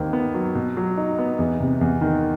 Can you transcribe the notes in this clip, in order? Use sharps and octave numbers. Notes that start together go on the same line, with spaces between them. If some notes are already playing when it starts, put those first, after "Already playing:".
Already playing: D#2 D#3 C4
B3
F#3
B2
F#3
D#4
B3
E2
C3
E2
D#3